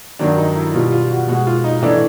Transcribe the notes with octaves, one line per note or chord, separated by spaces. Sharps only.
G2 D#3 F#3 D4
D#4
E4
B2 G3 F4
F4
F#4
B2 G#3 F#4
F4
D#4
A2 E3 A3 D4